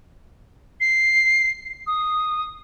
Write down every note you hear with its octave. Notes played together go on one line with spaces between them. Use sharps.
C7
D#6